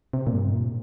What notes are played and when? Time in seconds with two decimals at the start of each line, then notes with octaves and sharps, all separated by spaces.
0.13 C3
0.27 A#2
0.33 G2
0.53 A#2